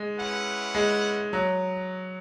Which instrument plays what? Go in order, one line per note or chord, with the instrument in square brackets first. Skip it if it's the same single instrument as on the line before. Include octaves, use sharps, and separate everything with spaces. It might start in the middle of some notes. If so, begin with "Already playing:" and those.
Already playing: [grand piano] G#3
[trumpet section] C#4 E4 B4 F#5
[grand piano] G#3
F#3